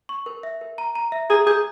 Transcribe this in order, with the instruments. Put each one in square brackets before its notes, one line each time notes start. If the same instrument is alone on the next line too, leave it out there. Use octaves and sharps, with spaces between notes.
[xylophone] C#6
A#4
E5
A#4
A#5
A#5
E5
[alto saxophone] G#4 [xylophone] A#5
[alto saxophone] G#4 [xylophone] G6